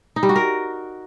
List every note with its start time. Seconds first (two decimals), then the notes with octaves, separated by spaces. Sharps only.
0.16 D#4
0.23 G3
0.29 F#4
0.36 A#4